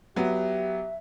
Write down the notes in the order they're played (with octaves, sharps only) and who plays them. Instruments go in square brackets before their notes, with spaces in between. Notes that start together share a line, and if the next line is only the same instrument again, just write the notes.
[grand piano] F#3 B3 [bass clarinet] G4 [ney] E5